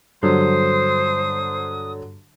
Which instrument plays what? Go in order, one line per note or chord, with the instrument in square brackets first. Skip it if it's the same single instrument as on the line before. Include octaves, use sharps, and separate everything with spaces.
[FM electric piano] G2 G3 [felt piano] D3 F#3 [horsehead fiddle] C5 [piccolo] D#6